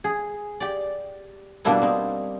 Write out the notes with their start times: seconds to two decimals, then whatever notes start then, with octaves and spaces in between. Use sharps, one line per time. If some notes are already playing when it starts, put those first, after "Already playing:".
0.04 G#4
0.60 G4 D5
1.65 B2 G3 A#3 D4 E4 B4
1.82 C4 D#4